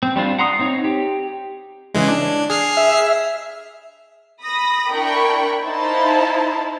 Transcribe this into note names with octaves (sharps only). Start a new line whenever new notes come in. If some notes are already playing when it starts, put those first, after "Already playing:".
C4
G3 C4 D4 F4
F#5 A#5 C6 D#6
C4 D#4 C#5
G4
C#3 E3 G#3
D4
G#4 F6 C7
E5
B5 D#6 A#6
D4 E4 A#4 G5 B5 C#6
D#4 E4 C5 F5 A5